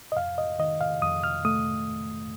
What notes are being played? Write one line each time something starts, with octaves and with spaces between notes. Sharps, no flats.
D#5
F2 F5
D#5
D#3 D#5
F5
F2 D#6
F6
A3 D#6